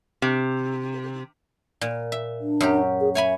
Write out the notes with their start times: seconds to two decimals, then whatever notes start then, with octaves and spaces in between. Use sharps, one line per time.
0.22 C3
1.81 A#2
2.12 E5
2.41 D4
2.61 F#2 F#3 G4
3.00 G#4
3.15 C#5 E5 G#5 B5